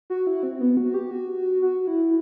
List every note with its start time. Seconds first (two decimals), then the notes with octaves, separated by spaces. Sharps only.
0.10 F#4
0.27 E4
0.43 C4
0.61 B3
0.77 F#4
0.94 G4
1.11 F#4
1.62 F#4
1.87 E4